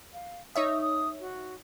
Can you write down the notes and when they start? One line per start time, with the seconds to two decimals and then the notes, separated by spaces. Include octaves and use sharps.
0.13 F5
0.56 D#4 C#5 E5 D#6
0.82 D#6
1.20 F#4